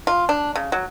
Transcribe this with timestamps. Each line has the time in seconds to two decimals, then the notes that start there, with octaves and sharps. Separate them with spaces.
0.07 F4
0.29 D4
0.56 C#3
0.72 F#3